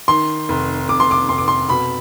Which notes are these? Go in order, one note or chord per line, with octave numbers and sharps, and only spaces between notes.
D#3 C6
F1
F1 D6
C6
D6
F1 C6
D6
C6
B2 B5